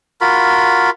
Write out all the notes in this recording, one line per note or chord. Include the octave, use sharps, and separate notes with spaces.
F4 F#4 A#4 B5